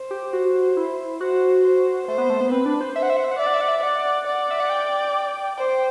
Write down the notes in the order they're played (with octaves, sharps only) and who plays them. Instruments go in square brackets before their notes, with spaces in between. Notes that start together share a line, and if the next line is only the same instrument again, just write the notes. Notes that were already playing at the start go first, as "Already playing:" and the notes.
Already playing: [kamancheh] C5
[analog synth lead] G4
F#4
E4
[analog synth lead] F#4 [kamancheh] C5
[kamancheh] C5
[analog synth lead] A3 [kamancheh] C5
[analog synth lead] B3
A3
B3
[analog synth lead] C4 [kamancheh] B4
[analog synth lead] D4
C5
[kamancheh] C5 [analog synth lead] E5
[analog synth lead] F#5
E5
F#5
E5
F#5
[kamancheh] D5 [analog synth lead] E5
[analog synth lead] F#5
E5
F#5
E5
[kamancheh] D5 [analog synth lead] F#5
[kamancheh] D5
[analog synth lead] E5
F#5
G5
[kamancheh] C5 [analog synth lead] G5